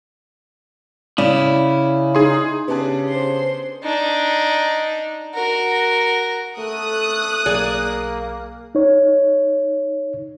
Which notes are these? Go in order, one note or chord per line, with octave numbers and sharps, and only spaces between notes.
C#3 E4 D5
D#4 G#4 C6
C#3 B3 D4 G4 G#4
C5 C6
D4 D#4
F#4 A#4
A3 A4 D#6 F#6
B1 A#3 G#4 D5
D#4 C#5